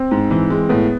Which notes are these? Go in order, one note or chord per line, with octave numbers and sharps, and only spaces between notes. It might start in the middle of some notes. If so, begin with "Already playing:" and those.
Already playing: C4
G#2
E3
G#3
A2 B3